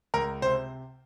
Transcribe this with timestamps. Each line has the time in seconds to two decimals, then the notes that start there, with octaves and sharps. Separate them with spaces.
0.14 C#2 A#4
0.42 C3 C5